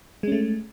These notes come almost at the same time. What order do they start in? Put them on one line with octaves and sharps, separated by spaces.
G#3 C#4 A3